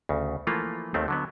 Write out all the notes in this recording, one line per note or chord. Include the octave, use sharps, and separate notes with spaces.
D2 C#3
E3 F3 A3 A#3 F4
D#2 D#3 A3 C4
D3 F#3 B3